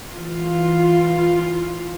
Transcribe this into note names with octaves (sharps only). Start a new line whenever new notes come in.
E3 F4